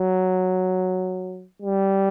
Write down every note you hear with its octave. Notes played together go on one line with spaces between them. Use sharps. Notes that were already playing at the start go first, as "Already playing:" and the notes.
Already playing: F#3
G3